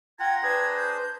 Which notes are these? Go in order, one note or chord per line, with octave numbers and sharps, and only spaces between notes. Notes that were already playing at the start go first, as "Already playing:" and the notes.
F4 F#5 G5 A#5 G#6
D4 G#4 B4 C5 G#6
G6